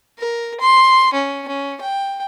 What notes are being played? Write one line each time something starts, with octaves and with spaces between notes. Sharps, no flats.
A#4
C6
C#4
C#4
G5